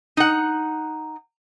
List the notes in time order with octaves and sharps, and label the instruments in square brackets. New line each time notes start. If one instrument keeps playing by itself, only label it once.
[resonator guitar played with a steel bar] D#4 F#5